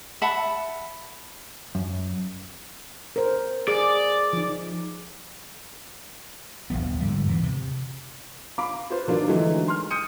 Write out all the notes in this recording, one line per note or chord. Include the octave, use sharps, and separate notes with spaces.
E5 F#5 A5 B5
F#2
A#4 C5
G#4 D5
F3 D#4
D#1 G#1 F3 B3
G#2 D3 G3
E2 E3
C3
F5 A#5 B5 D6
F4 B4 C5
D#3 F3 F#3 A#3 D4 F4
D3 E3 F#3 G#3 A3 D#4
C6 F6
D#6 G6 C#7 D#7